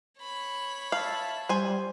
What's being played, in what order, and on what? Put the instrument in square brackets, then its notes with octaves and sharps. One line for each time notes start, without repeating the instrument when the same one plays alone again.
[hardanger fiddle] C#5 B5
[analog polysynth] E5 A5 [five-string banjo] F5
[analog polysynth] G3 [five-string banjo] C5 G#5